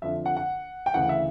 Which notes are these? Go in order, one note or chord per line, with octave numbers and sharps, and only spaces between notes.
F2 D3 F3 E5
F#5
F#5
G5
D2 C#3 E3 F#5
E5